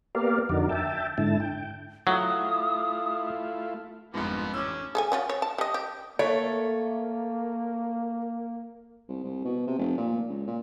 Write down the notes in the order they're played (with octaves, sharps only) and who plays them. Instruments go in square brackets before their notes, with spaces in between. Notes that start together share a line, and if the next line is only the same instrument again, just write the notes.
[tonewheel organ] A#3 B3 G4 A#4 D5 F5
F2 D3 D#4 F#4 A#4 D5
E5 G5 A5
G#2 D3 E4 A5
G5
[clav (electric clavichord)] F#3 [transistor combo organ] A3 E4 F4 [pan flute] D#6
[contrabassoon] G1 [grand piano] F2 G#2 [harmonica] F3 A#3 B3
[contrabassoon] A1 [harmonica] D3 C#4 [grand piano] D6 E6
[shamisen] G#4 A4 G#5
F#3 C#4 F4
C#5
A5
G3 D#5
G4
[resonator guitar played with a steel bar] A3 [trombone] A#3 [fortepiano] C#5
[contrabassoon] C2
C2
B2
C3
F1
A#2
C#2
A#2